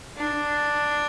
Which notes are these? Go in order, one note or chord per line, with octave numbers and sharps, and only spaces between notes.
D4